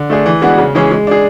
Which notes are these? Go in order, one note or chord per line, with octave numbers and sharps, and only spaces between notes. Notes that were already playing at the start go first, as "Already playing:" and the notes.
Already playing: D3
A3 D4 G#4
E3
G#3 B3 D4 F#4
C#3
E3 G#3 C#4 G#4
G#3
D4 G#4